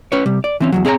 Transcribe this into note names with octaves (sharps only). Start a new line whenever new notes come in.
C#4 B4 C#5
C3 G3
D5
E3 C4 C#4
E2 D#3 F#3
C4 G#4 C#5 D5 A#5